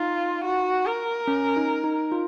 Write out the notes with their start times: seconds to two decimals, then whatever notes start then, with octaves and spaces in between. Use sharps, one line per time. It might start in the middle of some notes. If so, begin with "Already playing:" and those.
Already playing: D#4 F4
0.45 F#4
0.86 A#4
1.27 C#4
1.57 D#4
1.84 D#4
2.12 F4